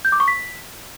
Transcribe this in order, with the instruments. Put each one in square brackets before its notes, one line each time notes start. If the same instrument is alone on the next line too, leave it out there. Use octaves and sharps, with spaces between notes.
[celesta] G6
D6
C#6
B6